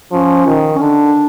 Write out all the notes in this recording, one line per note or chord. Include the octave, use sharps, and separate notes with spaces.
F3 C#4
D#3
C#4
D3 D4